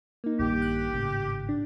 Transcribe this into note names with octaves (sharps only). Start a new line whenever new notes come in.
A#3 D#4
A#1 G2 D#3 G4
F#6
G#1 A2 C#3
D4